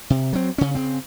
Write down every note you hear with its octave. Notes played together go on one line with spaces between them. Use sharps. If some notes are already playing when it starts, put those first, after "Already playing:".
C3
F#3 C4
C#3 C#4
C#3 C4